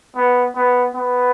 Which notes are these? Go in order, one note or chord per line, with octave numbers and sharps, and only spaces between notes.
B3
B3
B3